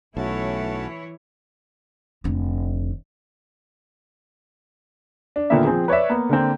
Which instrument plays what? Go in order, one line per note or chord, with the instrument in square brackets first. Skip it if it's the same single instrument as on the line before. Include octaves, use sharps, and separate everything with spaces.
[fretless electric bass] B1 [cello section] E3 E4 C#5 [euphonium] A3 [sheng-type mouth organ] C#4 F#4 A5
[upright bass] F1 D3
[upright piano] D4
A#2 D3 D#3 A#3 B3 E5
F3 C4 G#4
B4 C#5 D5 E5
A#3 B3
D3 A#3 C4